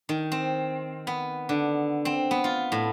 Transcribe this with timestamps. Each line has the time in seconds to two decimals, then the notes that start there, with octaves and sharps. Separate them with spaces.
0.09 D#3
0.32 C4
1.07 B3
1.49 D3
2.05 C4
2.31 B3
2.44 F4
2.72 A2